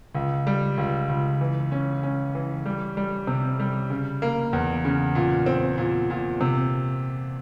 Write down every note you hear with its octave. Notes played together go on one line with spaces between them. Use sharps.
C#2
G3
C#2
C#2
E3
C#4
C#4
E3
G3
G3
C3
G3
C#3
A#3
E2
C#3
A#2
C4
A#2
A#2
C3